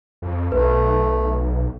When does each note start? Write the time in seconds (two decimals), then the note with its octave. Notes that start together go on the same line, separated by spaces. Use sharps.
0.22 F2
0.52 B1 A3 B4